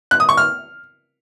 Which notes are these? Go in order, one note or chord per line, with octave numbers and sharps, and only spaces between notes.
F#6
D#6
C#6
F6